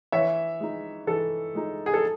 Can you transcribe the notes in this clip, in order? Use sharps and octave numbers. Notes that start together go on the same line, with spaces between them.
E3 C#5 E5
G#3 D#4
E3 A4
G#3 D#4
G#4
A4